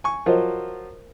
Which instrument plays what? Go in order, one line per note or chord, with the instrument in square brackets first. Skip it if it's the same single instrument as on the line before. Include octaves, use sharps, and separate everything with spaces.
[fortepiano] G#5 C#6
[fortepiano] F3 F#3 F4 [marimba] A#4 C5 D#5